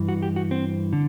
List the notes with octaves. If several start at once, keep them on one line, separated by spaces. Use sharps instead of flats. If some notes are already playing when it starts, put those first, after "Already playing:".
Already playing: G2 E3
F#4
G4
F#4
C4
D3